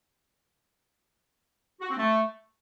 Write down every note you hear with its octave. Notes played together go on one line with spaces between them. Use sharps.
F#4
C4
A3